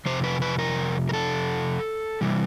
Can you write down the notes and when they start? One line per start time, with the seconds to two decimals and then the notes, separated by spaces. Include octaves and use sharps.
0.06 F2 C3 C5
0.24 B4
0.42 B4
0.59 A#4
1.09 A#4
1.13 A4
2.21 C3 E3 G3